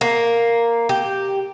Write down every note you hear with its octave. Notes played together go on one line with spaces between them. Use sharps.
A#3
G4